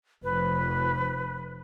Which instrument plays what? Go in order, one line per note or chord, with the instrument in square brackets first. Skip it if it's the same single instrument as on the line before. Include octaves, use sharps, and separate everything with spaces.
[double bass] F1 F3 [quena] B4